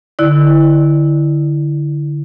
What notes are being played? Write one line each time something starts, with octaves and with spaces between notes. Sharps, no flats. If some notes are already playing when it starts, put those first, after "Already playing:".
D3 E4 D5